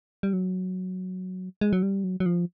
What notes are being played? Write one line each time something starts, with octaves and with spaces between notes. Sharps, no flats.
G3
F#3
G#3
F#3
G3
F#3
F#3
F3